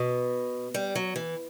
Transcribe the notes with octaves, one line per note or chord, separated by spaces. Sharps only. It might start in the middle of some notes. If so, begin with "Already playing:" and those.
Already playing: B2
G3
F#3
E3